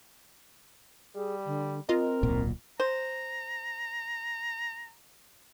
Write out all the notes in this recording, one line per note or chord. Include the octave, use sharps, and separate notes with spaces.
G3 G#4
D3
C4 F4 A#4 D#5
D1 B1 A#2
C5 A#5